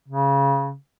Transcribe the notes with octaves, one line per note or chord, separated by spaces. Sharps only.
C#3